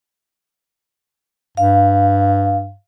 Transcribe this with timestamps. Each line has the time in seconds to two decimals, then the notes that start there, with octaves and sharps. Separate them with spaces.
1.57 G2 F5